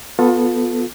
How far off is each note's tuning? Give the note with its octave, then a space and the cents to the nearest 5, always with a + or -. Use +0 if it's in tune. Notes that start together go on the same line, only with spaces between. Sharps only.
B3 +0 F4 +30 A4 +0